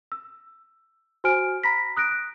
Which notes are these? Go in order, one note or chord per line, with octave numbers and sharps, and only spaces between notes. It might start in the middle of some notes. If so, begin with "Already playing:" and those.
E6
F#4 C5 G#5 F6 D7
A#5 B5 A#6 B6
D#6 F#6 A#6 D7